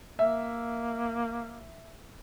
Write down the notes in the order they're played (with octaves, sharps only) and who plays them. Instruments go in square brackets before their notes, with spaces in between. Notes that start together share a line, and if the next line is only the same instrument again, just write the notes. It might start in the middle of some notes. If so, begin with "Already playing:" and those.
[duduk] A#3 [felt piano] E5